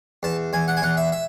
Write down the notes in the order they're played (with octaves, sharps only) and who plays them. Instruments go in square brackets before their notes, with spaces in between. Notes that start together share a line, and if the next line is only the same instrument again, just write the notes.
[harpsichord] E2 A5
E2 G#5
F#5
G#5
E2 F#5
E5
E5